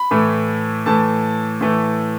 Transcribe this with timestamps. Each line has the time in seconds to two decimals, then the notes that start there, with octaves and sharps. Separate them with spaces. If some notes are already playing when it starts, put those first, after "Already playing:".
Already playing: B5
0.11 A2 E3 A3
0.86 A2 E3 A3 A5
1.61 A2 E3 A3